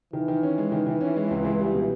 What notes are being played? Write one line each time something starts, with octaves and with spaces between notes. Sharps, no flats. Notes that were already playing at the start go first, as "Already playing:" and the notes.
D#3 E3
D#3
C#4
G#3
D#3
D#3
C#4
G#3
C#2
C#2
G3
B2